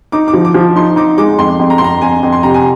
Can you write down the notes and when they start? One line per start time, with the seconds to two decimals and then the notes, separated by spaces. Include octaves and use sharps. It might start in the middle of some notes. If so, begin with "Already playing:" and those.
0.12 D#4 D6
0.28 D6
0.34 F3
0.45 D6
0.54 F3
0.76 D#4 C6
0.96 D#4 D6
1.17 G#3 D6
1.38 F2 C6
1.60 F2
1.70 A#5
1.78 C6
1.82 F2 A#5
2.02 F2 G#5
2.23 F2
2.32 C6
2.43 C3 A#5
2.54 G#5